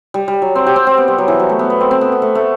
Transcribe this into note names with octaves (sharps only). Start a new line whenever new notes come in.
G3
G3
F#3
C4
G4
C4
C4
B3
G3
F#3
E3
F#3
A3
B3
B3
C4
C4
B3
B3
A3
A3